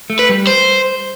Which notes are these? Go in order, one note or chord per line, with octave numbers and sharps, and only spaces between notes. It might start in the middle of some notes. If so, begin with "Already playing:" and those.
A3
B4
G3
C5